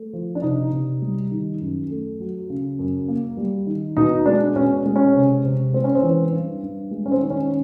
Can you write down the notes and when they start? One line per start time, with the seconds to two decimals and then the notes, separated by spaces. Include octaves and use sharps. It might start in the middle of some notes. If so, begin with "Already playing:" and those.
Already playing: A3
0.13 F3
0.35 D4
0.42 C3 D#4
0.72 C3
1.02 G3
1.31 D#3
1.61 F#2
1.90 A3
2.20 F#3
2.50 C#3
2.79 F#2
3.08 A#3
3.37 G3
3.67 D#3
3.97 B2 D#4
4.26 G#3 D4
4.56 B2 C#4
4.86 G#3
4.96 C#4
5.14 C3
5.45 C3
5.73 G#3 C4
5.84 C#4
5.95 C4
6.03 E3
6.33 G2
6.63 G2
6.91 G#3
7.06 C#4
7.12 C4
7.21 D#3
7.30 C#4
7.44 C#4